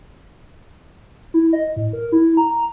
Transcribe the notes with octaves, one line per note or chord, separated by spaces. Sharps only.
E4
D#5
A2
A#4
E4
A#5